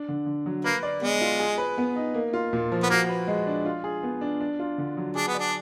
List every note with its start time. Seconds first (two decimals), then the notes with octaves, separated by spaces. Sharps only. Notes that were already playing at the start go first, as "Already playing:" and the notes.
Already playing: D4
0.08 D3
0.26 D3
0.46 F#3
0.64 A#3 B4
0.83 D5
1.01 G#3 B3
1.21 F4
1.40 G#4
1.58 B4
1.78 B3
1.96 D#4
2.14 A#3
2.33 F4
2.53 A#2
2.72 F3
2.83 B3
2.90 A#3 F#4
3.09 B4
3.27 G#3
3.47 D4
3.66 F4
3.84 G#4
4.03 B3
4.21 D4
4.40 D4
4.59 F4
4.78 D3
4.97 F#3
5.15 D4 G#4
5.27 B3
5.34 D4 D5